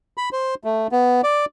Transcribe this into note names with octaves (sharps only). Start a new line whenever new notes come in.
B5
C5
A3
B3
D5